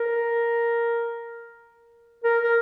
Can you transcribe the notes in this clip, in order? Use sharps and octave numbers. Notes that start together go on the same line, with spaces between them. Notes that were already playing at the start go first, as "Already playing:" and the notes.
Already playing: A#4
A#4
A#4